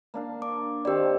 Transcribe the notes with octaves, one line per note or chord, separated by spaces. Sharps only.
A#3 D4 F5
D4 D6
D#3 A#3 C4 G4 D5